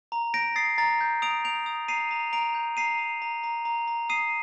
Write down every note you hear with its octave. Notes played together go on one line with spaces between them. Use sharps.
A#5
G6 A#6 D7
D#6 A6 C7
A#5 A6
G6
D#6 D7 F7
G6 D7 F7
D#6
A#5 C7 D#7
A#5
A#5 D7 F7
G6
A#5 C7 D#7
A#5
A#5
A#5
A#5
A#5
D#6 C7 D#7